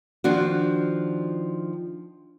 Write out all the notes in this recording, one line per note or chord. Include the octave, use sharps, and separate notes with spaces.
D#3 F3 D4 F#4